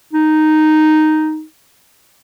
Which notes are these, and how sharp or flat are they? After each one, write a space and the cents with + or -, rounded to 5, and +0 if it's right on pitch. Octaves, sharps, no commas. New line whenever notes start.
D#4 -5